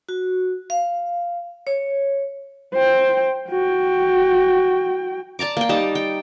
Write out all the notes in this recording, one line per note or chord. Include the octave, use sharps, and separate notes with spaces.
F#4
F5
C#5
C5 G5
F#4 G5
D5 A5 A#5 D6
A#3 G5
G3 D#4 A5 A#5
G5